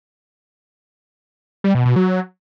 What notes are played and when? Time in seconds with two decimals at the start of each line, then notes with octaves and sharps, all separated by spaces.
1.64 G3
1.75 B2
1.85 B2
1.96 F#3